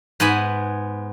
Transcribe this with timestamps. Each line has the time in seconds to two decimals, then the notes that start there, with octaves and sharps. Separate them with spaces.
0.20 G#2 B3 F#5 G#5 B5